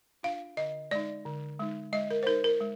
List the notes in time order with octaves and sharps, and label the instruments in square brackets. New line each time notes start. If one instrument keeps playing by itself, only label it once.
[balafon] D4 F4 F5
D3 D#5
G#3 D#4 D5
D3
G#3 D#4
G#3 D#5
A#4
C5
D#4 A#4
A#4
G#3